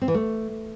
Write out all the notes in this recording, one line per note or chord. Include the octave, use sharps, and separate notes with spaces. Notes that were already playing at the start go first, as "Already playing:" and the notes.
C4
E3
A3